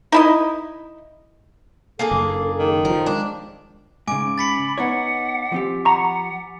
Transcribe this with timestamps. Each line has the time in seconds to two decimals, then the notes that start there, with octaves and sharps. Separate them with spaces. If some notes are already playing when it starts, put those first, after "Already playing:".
0.12 D#4 E4 D#5
1.99 A#3 D4 G#4 A4
2.11 F#1
2.59 D#3
2.85 F3 F#3 A#4
3.06 G#3 D4
4.07 G#2 C#3 G#5 D6 D7
4.38 B5 A6 B6 C#7
4.78 B3 D#4 C#5 F#5
5.52 F3 C4 G4
5.85 F#5 A#5 B5 C#6